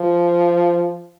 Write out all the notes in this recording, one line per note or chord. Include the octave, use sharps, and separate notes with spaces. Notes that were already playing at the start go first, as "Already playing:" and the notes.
Already playing: F3